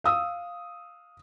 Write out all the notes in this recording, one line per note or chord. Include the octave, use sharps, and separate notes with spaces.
F5 D#6 E6